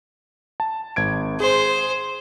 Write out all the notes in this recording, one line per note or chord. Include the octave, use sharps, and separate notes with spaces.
A5
G#1 G#6 D7
G#4 C5 C6